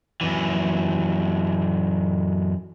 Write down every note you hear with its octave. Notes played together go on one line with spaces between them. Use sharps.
F#2 E3